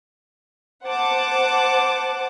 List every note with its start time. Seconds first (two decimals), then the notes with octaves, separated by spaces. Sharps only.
0.85 C5 F#5 A5 D6